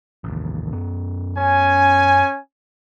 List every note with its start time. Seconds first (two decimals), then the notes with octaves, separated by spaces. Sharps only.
0.24 A1 D#2
0.73 F#2 B3
1.39 C#4 G#5